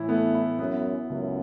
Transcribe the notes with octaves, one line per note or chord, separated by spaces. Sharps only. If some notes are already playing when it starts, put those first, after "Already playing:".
Already playing: A2 E3 E4
A3 B3
E4
F#2 B3
E4
C#2 F#2